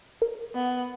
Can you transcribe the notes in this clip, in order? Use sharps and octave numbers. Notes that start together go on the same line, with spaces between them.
A#4
B3